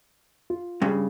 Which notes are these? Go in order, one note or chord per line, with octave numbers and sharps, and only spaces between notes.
F4
G2 C#3